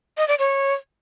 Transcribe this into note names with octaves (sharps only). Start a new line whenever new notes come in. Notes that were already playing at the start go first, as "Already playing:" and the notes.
D#5
D5
C#5